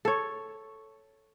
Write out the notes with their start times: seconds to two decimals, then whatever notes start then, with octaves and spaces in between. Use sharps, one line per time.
0.05 A4 C#5